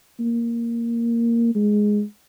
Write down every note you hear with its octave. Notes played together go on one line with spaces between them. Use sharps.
A#3
G#3